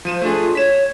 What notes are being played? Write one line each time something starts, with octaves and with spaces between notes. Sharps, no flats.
F3 C5 D#7 E7
A3 D4 F4 G#4
C#5 B6 E7